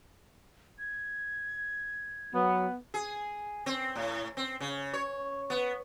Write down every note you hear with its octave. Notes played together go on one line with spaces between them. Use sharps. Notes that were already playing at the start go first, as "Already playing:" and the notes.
G#6
F#3 B3
G#4
C4
A2
C4
C#3
C#5
B3